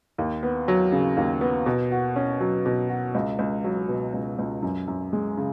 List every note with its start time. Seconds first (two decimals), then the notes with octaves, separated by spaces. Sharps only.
0.18 D#2
0.43 B3
0.68 F#3
0.92 C#3
1.17 D#2
1.41 B3
1.66 B2
1.92 F#4
2.16 C#4
2.41 F#3
2.66 B2
2.89 F#4
3.15 C#2
3.39 C#2
3.64 F#3
3.88 B2
4.14 C#2
4.39 C#2
4.62 F#2
4.88 F#2
5.13 G#3
5.37 C#3